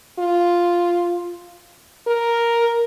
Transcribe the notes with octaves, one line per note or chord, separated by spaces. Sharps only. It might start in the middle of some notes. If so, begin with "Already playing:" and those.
F4
A#4